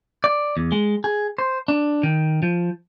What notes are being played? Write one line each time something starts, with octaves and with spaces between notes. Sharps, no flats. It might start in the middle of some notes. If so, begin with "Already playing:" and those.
D5
E2
G#3
G#4
C5
D4
D#3
F3